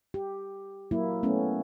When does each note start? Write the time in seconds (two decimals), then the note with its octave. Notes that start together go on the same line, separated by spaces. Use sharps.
0.14 G4
0.91 F#3 A#3 E4
1.23 A3 B3 C#4